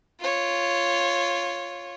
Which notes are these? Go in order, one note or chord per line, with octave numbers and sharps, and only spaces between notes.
F4 C#5